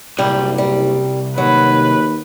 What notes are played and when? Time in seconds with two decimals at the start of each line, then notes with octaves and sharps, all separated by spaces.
0.18 F#1 C2 G3 F4
0.58 G3
1.38 D#2 F#3 B4